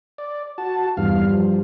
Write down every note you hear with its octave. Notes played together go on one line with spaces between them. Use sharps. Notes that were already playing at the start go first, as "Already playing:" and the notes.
D5
F#4 A5
E2 G2 F5
F3